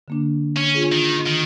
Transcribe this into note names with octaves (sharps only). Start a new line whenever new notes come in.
D3 A#3 D4
C#4
D4 F4 G#4
D#3
D#3